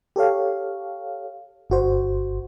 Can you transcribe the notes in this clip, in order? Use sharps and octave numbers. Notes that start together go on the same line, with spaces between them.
G4 A4 C#5 F5
G1 F#4 C5